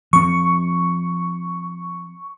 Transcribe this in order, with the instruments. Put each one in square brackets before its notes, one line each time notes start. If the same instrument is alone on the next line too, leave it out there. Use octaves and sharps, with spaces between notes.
[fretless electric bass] F3 C4 [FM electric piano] C#6